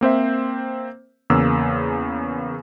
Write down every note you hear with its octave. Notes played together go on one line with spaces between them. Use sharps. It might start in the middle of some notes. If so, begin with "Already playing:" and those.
A#3 C4 C5 E5
E2 C#3 A#3 E6